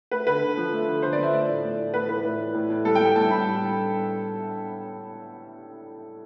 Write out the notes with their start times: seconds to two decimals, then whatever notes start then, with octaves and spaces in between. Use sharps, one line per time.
0.11 A3 B4
0.27 D3 B4
0.42 D3
0.57 F3
0.72 A3
0.87 D3
1.03 D3 C5
1.13 D5
1.18 F3 E5
1.33 A3 D5
1.48 A2
1.64 A2
1.79 E3
1.94 A3 B4
2.09 A2 B4
2.25 A2
2.39 E3
2.54 A2
2.70 A2
2.85 G3 A4
2.95 G5
3.00 G3
3.05 G5
3.16 A2 A5
3.31 A2 B5
3.46 G3
3.61 G3